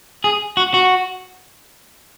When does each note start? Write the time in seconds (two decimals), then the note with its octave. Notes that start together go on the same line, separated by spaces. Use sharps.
0.24 G#4
0.57 F#4
0.74 F#4